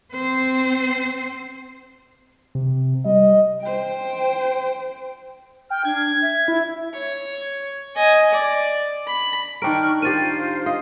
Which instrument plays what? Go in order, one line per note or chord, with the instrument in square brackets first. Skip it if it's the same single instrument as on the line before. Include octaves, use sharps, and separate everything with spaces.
[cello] C4 C5
[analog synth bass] C3
[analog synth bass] G3 [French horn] D#5
[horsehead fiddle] C5 G5
[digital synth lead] G5 [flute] F6
[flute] D4 [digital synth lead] G#6
[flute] E5
[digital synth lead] E4
[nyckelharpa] C#5
D#5 G#5
D5
B5
[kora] D#3 D4 A#4 [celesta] G5 D7 [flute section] C#6 F6
[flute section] F4 C5 [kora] G4 A#4 [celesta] A6 D#7
[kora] D#5 [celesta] F5